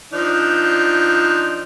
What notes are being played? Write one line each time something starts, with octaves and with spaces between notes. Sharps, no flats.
F3 D4 D#4